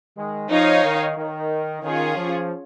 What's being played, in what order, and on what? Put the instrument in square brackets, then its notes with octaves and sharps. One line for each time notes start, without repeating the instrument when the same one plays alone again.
[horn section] D#3 G#3
[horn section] F3 [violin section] D#4 C#5 F5
[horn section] D#3
D#3
[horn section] D#3 [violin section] C#4 F4 G#4 C#5
[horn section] F3